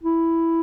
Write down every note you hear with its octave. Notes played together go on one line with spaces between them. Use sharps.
E4